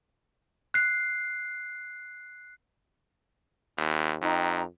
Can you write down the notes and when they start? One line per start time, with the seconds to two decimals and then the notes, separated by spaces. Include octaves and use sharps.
0.74 F#6 C7
3.78 D#2
4.22 F2 D#4 G5 A#5